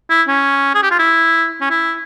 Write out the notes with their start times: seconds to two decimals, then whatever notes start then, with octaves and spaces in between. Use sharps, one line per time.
0.10 E4
0.28 C#4
0.74 G#4
0.83 G4
0.91 F4
0.99 E4
1.61 C#4
1.70 E4